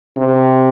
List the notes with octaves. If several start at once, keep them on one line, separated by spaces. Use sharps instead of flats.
C3